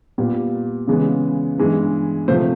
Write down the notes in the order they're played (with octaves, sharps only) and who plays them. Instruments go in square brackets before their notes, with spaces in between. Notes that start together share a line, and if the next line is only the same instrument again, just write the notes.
[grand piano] A#2 G3 B3
C#3 E3 G#3 B3
G2 E3 G#3 B3
C3 F3 A3 C5